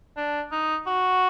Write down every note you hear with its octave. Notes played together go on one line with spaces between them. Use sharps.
D4
D#4
F#4